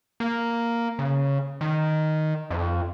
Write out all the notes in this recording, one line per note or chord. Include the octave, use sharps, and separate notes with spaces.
A#3
C#3
D#3
F2